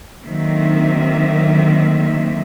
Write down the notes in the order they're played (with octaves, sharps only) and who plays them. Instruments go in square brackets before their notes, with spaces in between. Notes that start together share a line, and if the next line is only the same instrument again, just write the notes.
[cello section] D3 D#3 F#3 A#3 C4 E5